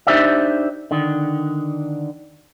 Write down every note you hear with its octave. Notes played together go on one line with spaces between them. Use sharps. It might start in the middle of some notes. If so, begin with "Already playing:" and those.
D4 D#4 G4 C5 D5 E5
D3 D#3